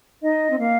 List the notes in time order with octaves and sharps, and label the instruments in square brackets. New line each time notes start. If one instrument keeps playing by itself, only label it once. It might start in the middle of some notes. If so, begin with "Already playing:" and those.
[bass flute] D#4 [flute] D#5
[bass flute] C4
[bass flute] A#3 [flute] F5